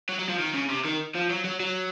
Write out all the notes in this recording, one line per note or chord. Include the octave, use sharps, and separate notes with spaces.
F#3
F#3
F3
D#3
C#3
C3
D#3
F3
F#3
F#3
F#3